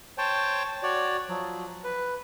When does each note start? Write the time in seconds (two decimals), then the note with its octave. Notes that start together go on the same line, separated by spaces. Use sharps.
0.18 C5 C#5 G5 A5
0.83 F#4 C#5 D5
1.29 F3 F#3
1.84 B4